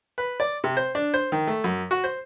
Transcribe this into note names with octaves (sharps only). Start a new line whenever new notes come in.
B4
D5
C3
C5
D4
C5
D#3
A3
F#2
F#4
C5